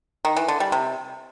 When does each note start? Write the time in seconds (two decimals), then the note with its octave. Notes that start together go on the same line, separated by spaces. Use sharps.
0.25 D#3
0.37 E3
0.48 D3
0.60 G3
0.72 C3